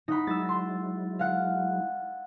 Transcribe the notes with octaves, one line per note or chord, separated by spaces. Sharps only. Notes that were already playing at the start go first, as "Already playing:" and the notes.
D#4 F#5 B5
F#3 G#3 E4 E6 A6
C6 A6
F5 F#5